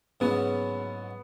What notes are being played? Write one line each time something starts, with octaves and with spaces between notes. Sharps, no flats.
G#2 F#3 B3 C#4